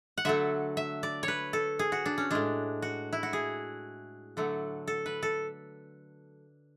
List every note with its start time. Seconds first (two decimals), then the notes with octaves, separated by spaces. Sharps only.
0.17 F#5
0.25 D3 F#3 A3 E5
0.77 E5
1.03 D5
1.23 C#5
1.28 B4
1.53 A4
1.79 G#4
1.92 F#4
2.06 D4
2.18 C#4
2.30 A2 G#3 D4
2.82 F#4
3.13 E4
3.23 F#4
3.33 G#4
4.37 D3 F#3 A3
4.87 A4
5.06 B4
5.23 A4